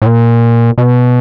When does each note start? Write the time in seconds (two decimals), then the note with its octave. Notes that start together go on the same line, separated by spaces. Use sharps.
0.02 A2
0.06 A#2
0.78 B2